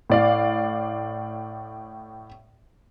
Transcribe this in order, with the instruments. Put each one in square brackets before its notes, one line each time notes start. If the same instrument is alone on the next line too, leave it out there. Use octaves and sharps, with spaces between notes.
[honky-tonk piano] A2 D5 F5